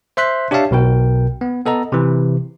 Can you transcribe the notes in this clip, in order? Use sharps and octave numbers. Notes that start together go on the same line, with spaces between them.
C5 E5 C6 F#6 B6
D4 G4 C#5 E5 F5 A5
B1 B2 A#4 G5
B3
B3 A4 D#5 A#5
C3 E3